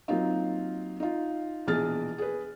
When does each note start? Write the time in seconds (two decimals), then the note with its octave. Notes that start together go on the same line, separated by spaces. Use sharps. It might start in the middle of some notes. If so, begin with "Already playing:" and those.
0.08 F#3 A#3 C4 D#4 F4
1.00 D#4 F4
1.67 A#1 B2 E3 G#4 F6 A6
2.18 G#4 B4